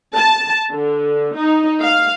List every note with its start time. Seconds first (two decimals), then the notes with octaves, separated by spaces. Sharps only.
0.17 A5
0.72 D3
1.36 D#4
1.83 F5